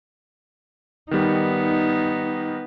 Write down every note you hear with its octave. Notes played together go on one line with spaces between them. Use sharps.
D#3 G3 B3 D#4